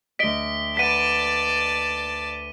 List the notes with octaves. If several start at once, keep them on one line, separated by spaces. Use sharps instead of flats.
D2 D#5 B6 D7 G7
B4 D5 F#5 A5 B6 D#7